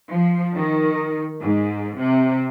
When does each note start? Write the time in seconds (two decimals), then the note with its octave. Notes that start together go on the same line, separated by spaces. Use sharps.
0.10 F3
0.54 D#3
1.40 G#2
1.98 C3